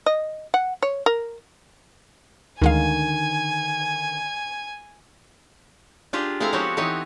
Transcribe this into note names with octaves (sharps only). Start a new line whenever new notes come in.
D#5
F#5
C#5
A#4
D2 D3 D#3 G#3 F5 G#5
D4 F4 G4 G#4
G#3 C4 E4 A4 F5 A#5
F3 B3 C4 F#4 G4 C#5
E3 B3 C4 D#4 C#5 D#5